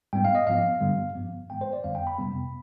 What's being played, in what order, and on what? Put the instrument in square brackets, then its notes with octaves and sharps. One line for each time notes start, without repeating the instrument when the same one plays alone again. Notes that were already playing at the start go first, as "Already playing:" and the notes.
[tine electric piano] G#2 G3 B3 G5
F5
D#5
G#2 F3 B3 F5
G2 D3 G3 B3
G2 F3 B3
G#2 D#3 G#3 B3 G5
C5
D5
F2 D3 G3 B3 F5
G5
B5
F2 C3 G3 B3